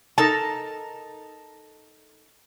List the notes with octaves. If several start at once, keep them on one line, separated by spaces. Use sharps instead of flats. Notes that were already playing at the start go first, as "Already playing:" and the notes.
D#4 A4 A#4 A5